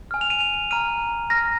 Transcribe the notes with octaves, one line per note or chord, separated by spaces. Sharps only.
G#5 F6
F7
D#7
F7
A#5 F6 D#7
A#5 F6 A#6